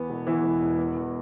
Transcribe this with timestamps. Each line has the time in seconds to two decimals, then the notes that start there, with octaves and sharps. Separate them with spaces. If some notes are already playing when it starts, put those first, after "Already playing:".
Already playing: E2 E3 B3
0.10 E1
0.27 E2 E3 E4
0.43 E1
0.62 E1
0.78 E2
0.96 E2